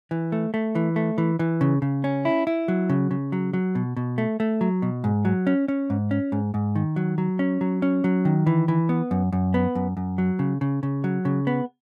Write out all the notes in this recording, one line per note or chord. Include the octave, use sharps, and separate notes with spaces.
E3
A3
A3
E3
A3
E3
E3
C#3
C#3
C#4
E4
E4
F#3
C#3
C#3
F#3
F#3
B2
B2
A3
A3
F#3
B2
G#2
F#3
C#4
C#4
G#2
C#4
G#2
G#2
D#3
F#3
F#3
C#4
F#3
C#4
F#3
D#3
E3
E3
B3
F#2
F#2
B3
F#2
F#2
F#3
C#3
C#3
C#3
F#3
C#3
B3